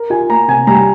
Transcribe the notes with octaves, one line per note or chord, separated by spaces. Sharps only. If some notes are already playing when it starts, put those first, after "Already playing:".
Already playing: A#4
F4 G#5
A#3 A#5
C3 G#5
G3 A#5